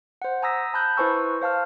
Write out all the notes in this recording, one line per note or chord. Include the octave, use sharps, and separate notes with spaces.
C5 F#5
G#5 A#5 D#6 E6 A#6 B6
A5 B5 F#6 G6
E4 B4 C5 G#5 C#6 E6
C5 F5 A5 F6